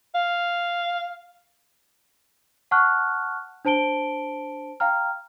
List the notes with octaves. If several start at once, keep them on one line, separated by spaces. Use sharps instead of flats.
F5
F#5 A5 C#6 F6 F#6
D4 C5 A5 D7 G7
F5 G5 A#5 F6